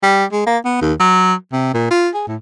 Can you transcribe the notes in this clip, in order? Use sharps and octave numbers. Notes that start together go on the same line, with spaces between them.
G3
G#3
A#3
B3
D#2
F#3
C3
A#2
F4
G#4
A2